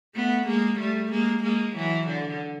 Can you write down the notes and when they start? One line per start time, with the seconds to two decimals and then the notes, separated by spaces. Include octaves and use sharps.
0.15 A3 B3
0.47 G#3 A#3
0.79 G3 A3
1.11 G#3 A#3
1.43 G#3 A#3
1.75 E3 F#3
2.07 D3